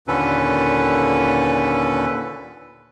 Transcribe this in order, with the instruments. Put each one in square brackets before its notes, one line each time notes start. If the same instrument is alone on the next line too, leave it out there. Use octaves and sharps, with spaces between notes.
[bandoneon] D#2 A#2 D3 C#4 A4 B4